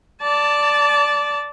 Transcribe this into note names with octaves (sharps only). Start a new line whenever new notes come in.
D5 A5